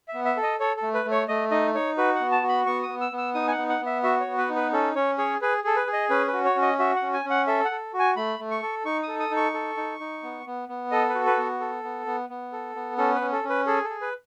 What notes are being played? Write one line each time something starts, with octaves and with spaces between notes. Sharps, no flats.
E5
B3
E5
A4
D#5
A4 C#5
A4
A3
B4
A3
C#5
A3 D#5
D#4 D#5
D#4 C#5
F#4 B4
F#5
B3
A5
F#4
B5
B3 C#6
D#6
B3
E6
B3
E6
D#4 D#6
G#5
F#5
B3
F#5
B3
E5
F#4 E5
C#5
B3
B4
D#4
B4
C#4 A4
C#4 C#5
G#4 C#5
G#4 B4
G#4 A4
B4
G#4
D#5
C#4 B4
B4
F#4
C#5
C#4
D#5
F#4 E5
F#5
C#4
G#5
C#4
F#5
A4 E5
F#5
A4
F#4
G#5
A3 B5
A3
C#6
A4
D#4 C#6
A4 D#6
D#6
D#4
C#6
A4
D#4
D#4
B3
B3
B3
A4 D#5
B4
F#4
B4
B3
A4
B3
B3
B3
A4
B3
C#4 A4
B4
C#4
A4
C#4
B4
G#4 A4
A4
G#4
B4